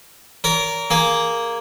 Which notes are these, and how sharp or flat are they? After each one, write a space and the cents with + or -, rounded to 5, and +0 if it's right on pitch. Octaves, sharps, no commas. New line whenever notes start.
A#4 +0 D5 -45
A#3 +0 G#4 +0